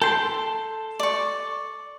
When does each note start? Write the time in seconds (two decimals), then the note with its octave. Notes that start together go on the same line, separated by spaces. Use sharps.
0.02 A4 G5 C6
0.99 D5 C#6